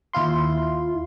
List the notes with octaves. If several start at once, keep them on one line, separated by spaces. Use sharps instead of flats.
D#2 E4 F4 C6